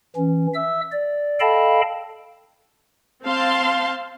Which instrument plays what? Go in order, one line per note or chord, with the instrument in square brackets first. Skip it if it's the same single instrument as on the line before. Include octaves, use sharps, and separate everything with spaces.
[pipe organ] E3 C#4
E5 E6
D5
A4 D#5 F5 G5 A5 B5
[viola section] C4 F5 A5 C6